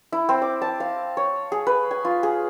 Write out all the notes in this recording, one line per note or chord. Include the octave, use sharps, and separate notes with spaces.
E4
C4
D6
A5
F5
C#5
G#4
B4
G#5
F4
G#4